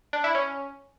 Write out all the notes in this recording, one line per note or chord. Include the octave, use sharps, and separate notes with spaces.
D4
E4
C#4